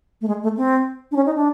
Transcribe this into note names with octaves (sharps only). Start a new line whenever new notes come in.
A3
G#3
A3
C4
D4
C#4
D#4
D4